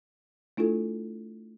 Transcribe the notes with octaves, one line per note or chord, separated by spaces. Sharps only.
A3 D4 E4 F4 A4